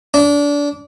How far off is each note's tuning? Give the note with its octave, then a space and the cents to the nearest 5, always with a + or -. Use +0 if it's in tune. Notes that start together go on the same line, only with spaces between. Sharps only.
D4 -25